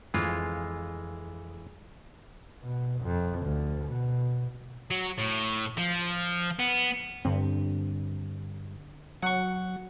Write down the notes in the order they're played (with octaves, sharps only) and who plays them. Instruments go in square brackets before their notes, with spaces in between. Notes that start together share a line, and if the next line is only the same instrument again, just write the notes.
[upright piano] F2 [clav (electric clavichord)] E3 G#3 F4
[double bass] B2
F2
D2
B2
[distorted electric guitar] F#3
A2
F3
B3
[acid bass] G2 [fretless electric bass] D3 C4
[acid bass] F#3 [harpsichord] F#5 C#6